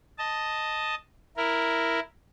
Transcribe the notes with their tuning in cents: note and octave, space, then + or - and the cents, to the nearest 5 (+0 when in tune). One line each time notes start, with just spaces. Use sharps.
D#5 +0 A5 +0
E4 +0 A#4 +0